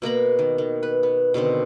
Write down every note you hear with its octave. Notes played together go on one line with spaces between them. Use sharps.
B2 A#3 A#5 B5
D#3
D#3
B4
B3
B2 D3 D#3 C4